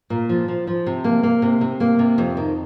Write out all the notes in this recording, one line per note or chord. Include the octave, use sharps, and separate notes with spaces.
A#2
F3
F3
F3
C3
A#3
A#3
C3
C3
A#3
C3
F2
D#3